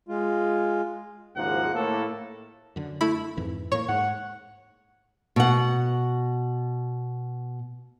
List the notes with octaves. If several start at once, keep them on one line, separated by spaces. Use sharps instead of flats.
G#3 F4
F#1 D#2 G#2 F3 A#3 F#5
A2 A#3 A4
F#2 D3
A3 E4 B5
F2 G#2 E3
A2 A#3 C#5 C#6
G#2 F#5
B2 F#5